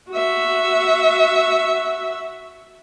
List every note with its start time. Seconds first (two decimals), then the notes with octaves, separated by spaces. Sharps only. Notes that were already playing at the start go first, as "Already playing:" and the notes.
0.11 F#4 E5